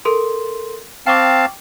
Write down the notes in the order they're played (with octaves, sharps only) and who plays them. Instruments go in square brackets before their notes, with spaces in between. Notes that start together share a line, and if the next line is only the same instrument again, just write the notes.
[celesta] A4 A#4 C6
[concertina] C4 F5 A5 [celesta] G5 C#6 D6